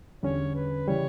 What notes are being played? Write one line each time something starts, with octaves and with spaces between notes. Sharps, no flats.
E2 D3 G3 C#4 C#5
B4
C#3 E3 G3 C#5